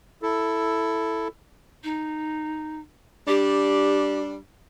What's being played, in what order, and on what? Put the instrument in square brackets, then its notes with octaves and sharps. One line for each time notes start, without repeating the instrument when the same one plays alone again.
[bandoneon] E4 A4
[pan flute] D#4
[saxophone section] G3 D4 [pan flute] G4